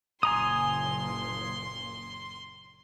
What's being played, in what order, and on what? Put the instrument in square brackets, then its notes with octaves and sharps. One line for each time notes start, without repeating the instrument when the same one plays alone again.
[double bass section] F#1 A#2 [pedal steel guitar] G#5 A#5 D#6 [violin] C6